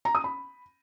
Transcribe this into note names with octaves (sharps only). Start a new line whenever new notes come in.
A#5
D#6
B5